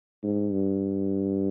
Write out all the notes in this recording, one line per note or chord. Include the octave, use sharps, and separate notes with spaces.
G#2
G2